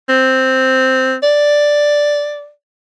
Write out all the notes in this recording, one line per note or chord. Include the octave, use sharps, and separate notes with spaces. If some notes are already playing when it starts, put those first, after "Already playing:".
C4
D5